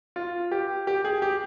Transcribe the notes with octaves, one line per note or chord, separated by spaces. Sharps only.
F4
G4
G4
G#4
G4